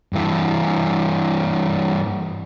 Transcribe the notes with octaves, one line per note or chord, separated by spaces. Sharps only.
G2 E3